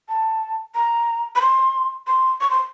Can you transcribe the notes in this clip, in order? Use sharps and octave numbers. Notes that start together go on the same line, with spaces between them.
A5
A#5
B5
C6
C6
C#6
C6